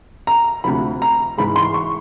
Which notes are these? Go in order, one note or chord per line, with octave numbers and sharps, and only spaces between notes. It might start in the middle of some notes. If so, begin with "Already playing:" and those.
A#5
D2 C3 F3 B5
A#5
G#2 E3 G#3 B5
C6
C#6